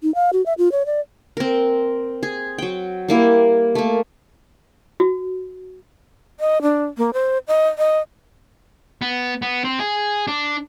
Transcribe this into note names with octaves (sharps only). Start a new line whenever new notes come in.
D#4
F5
F#4
E5
F4
C#5
D5
C4 A#4
G#4
F#3 G5
G3 A#3 E4
A3 A#3
F#4
D#5
D4
A#3
C5
D#5
D#5
B3
B3
C4
G#4
D4